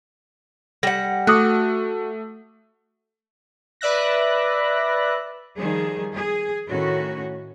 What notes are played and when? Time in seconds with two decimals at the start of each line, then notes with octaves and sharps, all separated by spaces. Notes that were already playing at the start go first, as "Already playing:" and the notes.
0.83 G3 F#5 A#6
1.27 A3 F#4 D6 D#6 F#6
3.81 B4 D5 E5 F#6 A#6
5.56 D#3 F3 G3 G#4
6.14 G#4
6.68 A2 D#3 C#4 F#4